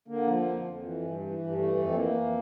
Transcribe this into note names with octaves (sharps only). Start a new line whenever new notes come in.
D3 A#3
F3
A#3
F2
F2
E3
G2
E3
G2
E3 A3
F2
C4
E3 A#3
F2